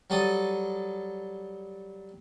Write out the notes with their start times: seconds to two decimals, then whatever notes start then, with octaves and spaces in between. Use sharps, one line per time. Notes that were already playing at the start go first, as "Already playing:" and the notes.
0.10 F#3 G3 A4 D#6